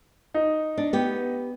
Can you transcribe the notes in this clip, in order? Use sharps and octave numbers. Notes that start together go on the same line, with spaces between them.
D#4
D4
B3 G4